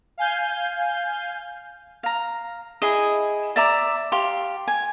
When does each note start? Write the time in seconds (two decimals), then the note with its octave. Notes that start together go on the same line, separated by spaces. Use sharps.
0.18 F5 G#5 G6
2.03 F5 A#5
2.82 E4 G#4 D#5
3.56 D5 E5 A#5 D6
4.12 G4 F5 C6
4.67 G#5